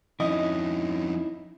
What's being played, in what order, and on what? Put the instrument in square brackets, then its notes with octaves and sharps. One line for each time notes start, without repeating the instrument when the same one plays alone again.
[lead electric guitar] F2 C#4 [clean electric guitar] D#4 E4 [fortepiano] D#5